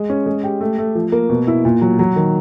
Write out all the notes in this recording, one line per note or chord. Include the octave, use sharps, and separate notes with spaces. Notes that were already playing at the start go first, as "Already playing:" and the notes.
Already playing: G#3
C#4
G#3
G4
A3
A3
F3
A#3
B2
E4
A#2
F#3
F#3
D#3